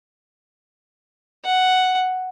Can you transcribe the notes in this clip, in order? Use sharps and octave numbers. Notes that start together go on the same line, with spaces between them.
F#5